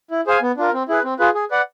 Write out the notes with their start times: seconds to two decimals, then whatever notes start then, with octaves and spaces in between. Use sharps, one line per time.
0.11 E4
0.27 G#4 C5 F5 G#5
0.42 B3
0.57 D4 F4 A#4
0.73 C4
0.89 E4 G#4 B4
1.04 C4
1.19 F4 G#4 B4
1.34 G#4
1.51 B4 D5 F#5